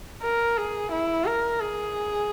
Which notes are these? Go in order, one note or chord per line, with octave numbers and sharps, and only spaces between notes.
A#4
G#4
E4
A#4
G#4